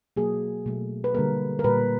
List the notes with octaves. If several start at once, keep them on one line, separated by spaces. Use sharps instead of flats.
B2 F#3 A#3 G#4
B2 F#3 A3
B4
D3 G3 A#3 A#4
A#4
A#2 G3 A#3 B4